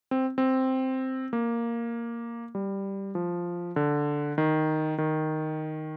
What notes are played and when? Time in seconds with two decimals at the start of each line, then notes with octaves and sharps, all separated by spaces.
0.11 C4
0.38 C4
1.33 A#3
2.55 G3
3.15 F3
3.76 D3
4.38 D#3
4.98 D#3